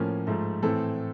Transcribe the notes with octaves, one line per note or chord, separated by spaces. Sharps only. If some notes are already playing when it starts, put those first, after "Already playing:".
Already playing: A2 F3 A#3 C#4
G#2 F3 A3
A2 E3 A3 C4 A4